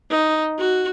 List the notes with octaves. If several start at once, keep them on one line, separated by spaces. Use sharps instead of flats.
D#4
F#4